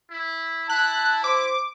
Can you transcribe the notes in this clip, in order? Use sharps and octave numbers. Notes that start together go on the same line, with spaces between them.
E4
E4 A5 F#6
C5 D6